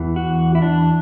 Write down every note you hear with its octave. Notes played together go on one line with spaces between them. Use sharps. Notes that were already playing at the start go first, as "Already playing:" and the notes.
Already playing: E2 E3
F#4
E4
D4